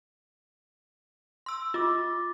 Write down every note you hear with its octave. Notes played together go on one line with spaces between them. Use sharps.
C6 E6
F4 D6 A6